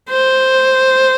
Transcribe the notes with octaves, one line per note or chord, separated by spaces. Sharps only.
C5